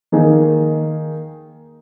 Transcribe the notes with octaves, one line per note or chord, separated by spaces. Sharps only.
D#3 A#3 D#4 G#4